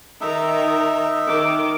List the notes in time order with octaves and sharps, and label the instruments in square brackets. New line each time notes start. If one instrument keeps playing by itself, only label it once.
[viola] D#3 A#5 [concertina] D#4 E5
[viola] D#3 D6